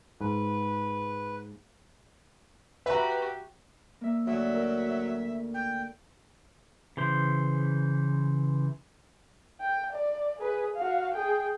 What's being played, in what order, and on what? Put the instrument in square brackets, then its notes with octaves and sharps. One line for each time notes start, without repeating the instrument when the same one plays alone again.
[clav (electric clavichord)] G#2 [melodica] B4
[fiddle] F#4 G4 [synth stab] B4 [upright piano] E5 A#5
[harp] A#3 E5
[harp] D2 [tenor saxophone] F#3 [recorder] E5
[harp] A#4
[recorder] G5
[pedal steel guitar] C#3 E3 C5
[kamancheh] G5
D5
G#4 B4
F#4 F5
G#4 G5